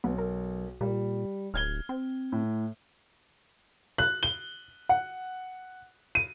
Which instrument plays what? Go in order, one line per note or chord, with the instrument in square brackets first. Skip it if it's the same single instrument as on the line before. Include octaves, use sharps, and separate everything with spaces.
[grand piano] B1 [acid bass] B3
[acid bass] A#4
[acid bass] A#2 [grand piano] G3
[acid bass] D1 [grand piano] F6 G#6 G7
[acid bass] C4
[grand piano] A2
[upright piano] F#6
G7
F#5
D#7